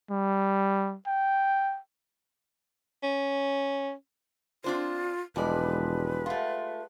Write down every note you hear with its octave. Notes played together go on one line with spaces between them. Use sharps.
G3
G5
C#4
C4 D4 F4 C5
E1 F2 F3 G3 G#3 B4 D5
A3 F4 F#5 C6